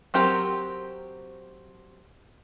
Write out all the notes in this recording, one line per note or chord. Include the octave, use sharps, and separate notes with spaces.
F#3 C4 G4 A#4